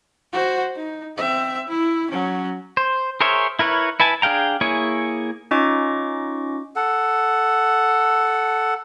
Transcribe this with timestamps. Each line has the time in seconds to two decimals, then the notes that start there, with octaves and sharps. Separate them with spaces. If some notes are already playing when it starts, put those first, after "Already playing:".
0.33 F#4 C5
0.76 D#4
1.17 C4 E5
1.68 E4
2.10 F#3 C#4
2.77 C5
3.21 G#4 A#4 C5 C#5 E5
3.59 E4 A#4 B4 C#5
4.00 E4 B4 G#5 A5
4.22 D4 G#4 F5 G5 A#5
4.61 A#3 E4 G#4 C#5 G#5
5.51 C#4 D#4 F4 D#5 C#6 D6
6.76 A4 F#5